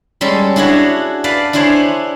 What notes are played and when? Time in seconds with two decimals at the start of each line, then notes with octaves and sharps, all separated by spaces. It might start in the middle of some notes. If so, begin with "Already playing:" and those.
0.21 G3 G#3 C#4 A4
0.56 D4 E4 F#4 G#4 C#5
1.24 B4 D5 F5 A5
1.53 D4 E4 G#4 C5 C#5